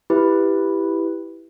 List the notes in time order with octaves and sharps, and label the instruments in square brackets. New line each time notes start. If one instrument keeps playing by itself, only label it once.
[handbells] E4 G4 B4